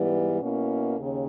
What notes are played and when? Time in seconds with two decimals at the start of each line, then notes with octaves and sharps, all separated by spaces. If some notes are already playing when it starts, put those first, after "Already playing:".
Already playing: G#2 E3 G3 B3
0.42 B2 A#3 C#4 E4
0.98 D#2 C#3